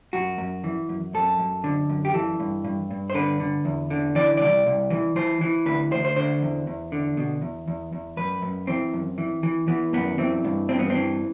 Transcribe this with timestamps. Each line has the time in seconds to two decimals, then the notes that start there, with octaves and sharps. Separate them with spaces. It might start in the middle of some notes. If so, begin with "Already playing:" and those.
0.13 F#2 F#4
0.38 F#2
0.64 E3
0.89 F#2
1.14 F#2 A4
1.39 F#2
1.64 D3
1.90 F#2
2.05 G4
2.14 E3 A4
2.40 G2
2.65 G2
2.91 G2
3.10 C5
3.14 D3 B4
3.40 D3
3.65 E2
3.90 D3
4.15 E3 D5
4.37 C2 D5
4.66 C2
4.90 E3
5.16 E3 C5
5.41 E3
5.66 D2 B4
5.91 D2 C5
6.05 C5
6.16 D3 C5
6.42 E2
6.67 E2
6.92 D3
7.17 B2
7.42 E2
7.68 E2
7.93 E2
8.17 F#2 B4
8.42 F#2
8.67 E3 C4
8.94 F#2
9.18 E3
9.43 E3
9.68 E3 B3
9.93 F#2 B3
10.18 E3 C4
10.44 G2
10.69 G2 C4
10.79 B3
10.90 E3 C4